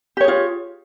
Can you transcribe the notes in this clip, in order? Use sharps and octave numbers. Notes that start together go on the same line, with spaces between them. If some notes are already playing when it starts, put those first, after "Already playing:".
F4 G4 G#4 C#5